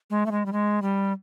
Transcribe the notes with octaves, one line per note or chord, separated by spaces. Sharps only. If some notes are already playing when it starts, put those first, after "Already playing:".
G#3
A3
G#3
G3
G#3
G3